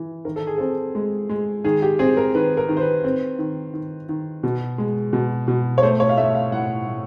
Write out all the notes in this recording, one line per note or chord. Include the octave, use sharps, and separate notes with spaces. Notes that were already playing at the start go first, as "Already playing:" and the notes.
Already playing: E3
D#3 A#4
A4
G#4
C4 A4
G#3
G#3
D#3 G#4
G4
C4 G#4
A#4
D#3 B4
A#4
D#3
C5
B4
C4
D#3
D#3
D#3
B2
G#3
B2
B2
C#5
A3 C5
C#5
F5
A3 E5
F5
A2 F#5
A2